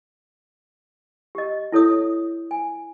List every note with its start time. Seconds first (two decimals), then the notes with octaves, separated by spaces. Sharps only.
1.35 G4 D#5
1.72 E4 A4 C#5 D#6
2.51 G#5